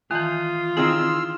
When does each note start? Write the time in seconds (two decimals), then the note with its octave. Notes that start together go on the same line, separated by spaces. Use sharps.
0.11 D#3 E3 F4 G#5 D#6
0.77 D#3 C4 E4 G#4 C6 E6 F6